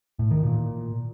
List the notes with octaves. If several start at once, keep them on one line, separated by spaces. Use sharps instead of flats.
A2
D#3
A#2